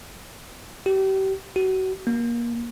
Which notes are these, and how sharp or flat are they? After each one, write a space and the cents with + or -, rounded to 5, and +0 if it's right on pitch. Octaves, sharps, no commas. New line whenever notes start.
G4 -35
F#4 +30
A#3 +25